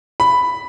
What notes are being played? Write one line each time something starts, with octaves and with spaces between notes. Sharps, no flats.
B5